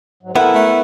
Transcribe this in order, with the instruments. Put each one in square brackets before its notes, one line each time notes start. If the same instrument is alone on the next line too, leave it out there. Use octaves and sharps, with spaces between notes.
[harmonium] G#2 F#3
[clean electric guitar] B3 E4 [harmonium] A4 A#4 E5 [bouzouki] F#5
[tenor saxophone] A3